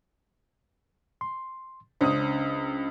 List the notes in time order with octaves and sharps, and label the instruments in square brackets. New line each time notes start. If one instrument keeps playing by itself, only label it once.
[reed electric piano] C6
[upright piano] C#2 D#6 [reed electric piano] C#4 D4 C5